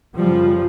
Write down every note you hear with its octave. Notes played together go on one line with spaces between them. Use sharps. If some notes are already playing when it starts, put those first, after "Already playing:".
F#2 C#3 F3 G3